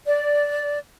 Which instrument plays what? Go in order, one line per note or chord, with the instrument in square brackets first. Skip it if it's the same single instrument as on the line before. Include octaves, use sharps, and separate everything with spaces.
[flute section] D5